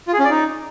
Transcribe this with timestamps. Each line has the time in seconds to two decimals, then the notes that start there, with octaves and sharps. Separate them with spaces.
0.07 F4
0.13 G#4
0.19 C#4
0.25 D5
0.30 D#4